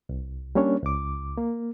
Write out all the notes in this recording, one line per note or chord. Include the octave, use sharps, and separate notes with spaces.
C2
G3 A#3 C#4 D4 C#5
C#2 D6
A#3